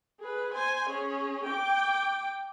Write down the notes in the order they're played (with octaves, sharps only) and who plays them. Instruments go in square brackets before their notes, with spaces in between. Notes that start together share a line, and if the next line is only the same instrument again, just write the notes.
[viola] G#4 B4
C5 G#5
C#4 G#4
G5 D6